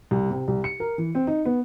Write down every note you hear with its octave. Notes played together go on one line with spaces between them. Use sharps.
C2
C3
C2
C#7
A#4
E3
C4
D#4
B3